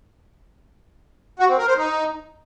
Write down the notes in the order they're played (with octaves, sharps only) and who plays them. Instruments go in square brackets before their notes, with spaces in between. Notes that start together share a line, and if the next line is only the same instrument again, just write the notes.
[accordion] F#4
C4
A#4
C5
D#4